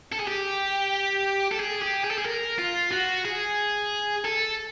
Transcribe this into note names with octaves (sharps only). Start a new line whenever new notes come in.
A4
G#4
G4
A4
G#4
G4
G#4
A4
G#4
A#4
F4
F#4
G#4
A4